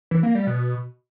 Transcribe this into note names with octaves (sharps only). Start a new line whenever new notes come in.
E3
A#3
G3
B2